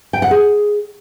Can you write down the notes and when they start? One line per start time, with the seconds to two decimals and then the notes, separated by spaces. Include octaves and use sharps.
0.13 G5
0.22 F#5
0.31 G#4